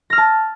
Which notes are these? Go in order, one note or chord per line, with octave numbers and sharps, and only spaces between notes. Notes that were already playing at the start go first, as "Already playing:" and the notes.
A5 E6 F6 A#6